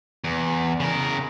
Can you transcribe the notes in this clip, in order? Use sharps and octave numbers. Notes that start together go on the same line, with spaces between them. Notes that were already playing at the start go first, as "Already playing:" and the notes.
E2
C#3 A#4